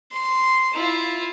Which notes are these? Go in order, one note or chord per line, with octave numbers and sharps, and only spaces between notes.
C6
E4 F4